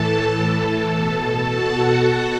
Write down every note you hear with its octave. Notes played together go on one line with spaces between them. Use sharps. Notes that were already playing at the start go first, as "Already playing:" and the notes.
Already playing: A2 E3 A4 A5
B2
F#4 F#5